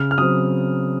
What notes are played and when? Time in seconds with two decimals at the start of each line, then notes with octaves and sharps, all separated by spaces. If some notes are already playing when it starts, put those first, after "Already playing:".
Already playing: C#3 F6
0.11 F6
0.18 F#3 C4 D#6